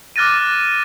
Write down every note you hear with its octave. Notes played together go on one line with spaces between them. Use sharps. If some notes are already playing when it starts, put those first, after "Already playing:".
D6 F6 F#6 A6 A#6 D#7